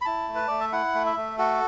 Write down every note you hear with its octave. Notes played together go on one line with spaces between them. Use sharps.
B5
E4 A5
A3
B4
A3 D5
E5
E4 F#5
A3
E5
A3
F#4 A4